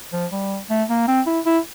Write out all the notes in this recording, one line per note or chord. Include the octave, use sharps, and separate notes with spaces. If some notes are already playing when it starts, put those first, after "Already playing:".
F3
G3
A3
A#3
C4
E4
E4